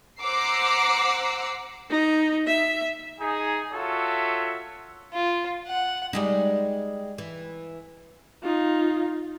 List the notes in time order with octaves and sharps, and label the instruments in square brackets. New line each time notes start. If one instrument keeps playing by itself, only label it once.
[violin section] C5 F#5 A#5 D6 E6 C7
[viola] D#4
E5
[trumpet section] D#4 G#4
F4 F#4 A4 C#5 E5
[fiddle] F4
F#5
[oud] G3 G#3 D#4
E3
[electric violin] D#4 F4